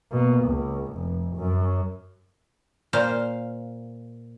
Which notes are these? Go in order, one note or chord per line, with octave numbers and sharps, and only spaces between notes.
B2 A#3
C#2
F1
F#2
A#2 C5 F5